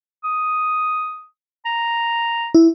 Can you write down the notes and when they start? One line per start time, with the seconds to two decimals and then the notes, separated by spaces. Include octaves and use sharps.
0.24 D#6
1.66 A#5
2.55 E4